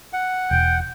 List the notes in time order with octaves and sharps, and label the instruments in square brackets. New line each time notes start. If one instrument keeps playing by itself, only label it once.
[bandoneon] F#5
[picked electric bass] E1 [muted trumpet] G5